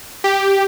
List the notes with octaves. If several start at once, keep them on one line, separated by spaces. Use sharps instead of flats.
G4